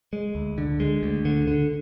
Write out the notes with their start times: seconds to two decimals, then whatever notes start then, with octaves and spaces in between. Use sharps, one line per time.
0.13 G#3
0.35 D2
0.58 D3
0.80 G#3
1.03 D2
1.25 D3
1.47 D3